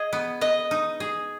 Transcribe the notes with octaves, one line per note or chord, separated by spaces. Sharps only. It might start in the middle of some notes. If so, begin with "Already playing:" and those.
Already playing: G#4 D#5
B3
B4 D#5
D#4
G#4